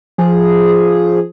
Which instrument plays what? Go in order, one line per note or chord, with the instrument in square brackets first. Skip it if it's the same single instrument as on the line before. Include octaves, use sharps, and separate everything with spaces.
[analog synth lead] F3 [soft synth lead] G#4